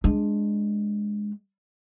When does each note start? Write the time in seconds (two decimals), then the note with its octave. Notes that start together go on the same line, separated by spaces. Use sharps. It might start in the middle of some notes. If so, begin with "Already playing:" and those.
0.04 G#3 D4